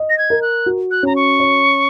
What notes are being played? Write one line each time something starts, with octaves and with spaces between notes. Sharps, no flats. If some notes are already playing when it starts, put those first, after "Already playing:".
Already playing: D#5
A#6
G#6
A#4
F#6
F#4
F#6
C#4 A#5
C#6
C#5